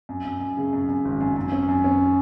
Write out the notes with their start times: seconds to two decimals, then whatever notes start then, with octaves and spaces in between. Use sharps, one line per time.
0.09 F#2
0.24 F#2
0.40 F#2
0.57 C#3
0.73 F#2
0.89 F#2
1.05 G#1
1.21 F#2
1.36 F#2
1.52 C#4
1.68 F#2
1.84 C#4